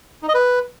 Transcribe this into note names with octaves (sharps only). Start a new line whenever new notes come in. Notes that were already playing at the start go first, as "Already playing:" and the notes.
D#4
D#5
B4